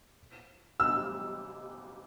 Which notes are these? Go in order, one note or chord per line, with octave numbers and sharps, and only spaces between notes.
E6